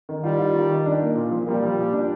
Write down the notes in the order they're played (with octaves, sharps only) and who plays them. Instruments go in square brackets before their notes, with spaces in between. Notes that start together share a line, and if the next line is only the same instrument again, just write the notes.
[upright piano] D#3
[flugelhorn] G3 [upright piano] F4
[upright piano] F4
D#3
D#3
D4
A#3
A#2
F3
[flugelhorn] G3 [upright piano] A#3
[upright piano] F3
A#2
D4